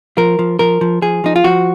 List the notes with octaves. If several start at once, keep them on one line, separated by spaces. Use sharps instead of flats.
F3 A#4
F3
F3 A#4
F3
F3 G#4
F3 D#4
F4
F3 F#4